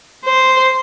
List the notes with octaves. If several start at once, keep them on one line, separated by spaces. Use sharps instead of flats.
C5